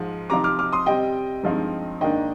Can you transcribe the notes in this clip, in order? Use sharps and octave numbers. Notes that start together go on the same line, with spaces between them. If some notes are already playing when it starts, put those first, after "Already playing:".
Already playing: G#2 F3 G#3
C3 F3 C4 D#4 A#5 D6
D6 F6
D6 F6
C6 D#6
C3 G3 C4 D#5 G5
G2 F3 G#3 C4 D#4
G#2 D#3 A#3 D4 D#5 G5